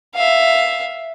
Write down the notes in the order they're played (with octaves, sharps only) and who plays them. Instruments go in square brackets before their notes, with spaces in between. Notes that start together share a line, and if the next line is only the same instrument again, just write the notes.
[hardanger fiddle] E5 F5